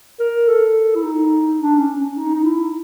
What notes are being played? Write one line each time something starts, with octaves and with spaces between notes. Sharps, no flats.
A#4
A4
E4
D#4
D4
C#4
C#4
D#4
D#4
E4